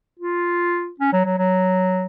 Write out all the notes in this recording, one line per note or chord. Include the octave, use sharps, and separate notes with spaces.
F4
C#4
F#3
F#3
F#3